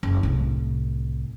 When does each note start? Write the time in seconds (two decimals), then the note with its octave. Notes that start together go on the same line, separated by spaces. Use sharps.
0.03 F#1
0.23 C2 A2